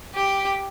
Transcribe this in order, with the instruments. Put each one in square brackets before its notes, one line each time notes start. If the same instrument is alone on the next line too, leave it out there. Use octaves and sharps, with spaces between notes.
[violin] G4